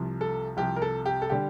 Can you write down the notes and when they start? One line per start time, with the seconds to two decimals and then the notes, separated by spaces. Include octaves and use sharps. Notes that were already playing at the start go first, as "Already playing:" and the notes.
Already playing: C2 C3 F3
0.21 A4
0.57 C2 C3 F3 G4
0.76 A#4
0.82 A4
1.06 G4
1.22 A4
1.29 D3 G3 G4